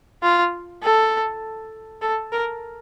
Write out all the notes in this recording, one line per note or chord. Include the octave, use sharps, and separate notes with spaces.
F4
A4
A4
A#4